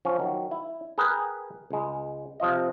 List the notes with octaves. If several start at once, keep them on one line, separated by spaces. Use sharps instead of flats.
F3 C#4
D#3 F#3
E4
G#4 A#4 B4 G5
C#2 G#3
C3 F3 F4 D#5